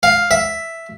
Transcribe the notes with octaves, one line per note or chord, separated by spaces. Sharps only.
F5
E5